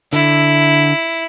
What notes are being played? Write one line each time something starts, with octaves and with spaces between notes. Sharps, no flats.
D3 E4